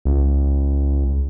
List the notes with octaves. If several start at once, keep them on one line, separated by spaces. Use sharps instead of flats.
C#2